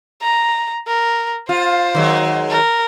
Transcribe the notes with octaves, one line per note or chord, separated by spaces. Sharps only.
A#5
A#4
F4 C5
D#3 F#3 G#3
A#4